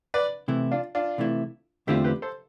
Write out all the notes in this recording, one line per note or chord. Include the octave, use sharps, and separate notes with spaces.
B4 D5
C3 E3 A3 E4
D4 F4
D4 F4
C3 E3 A3 E4
E2 D3 A3 C4 E4 F4 G4
G4 B4
A4 C5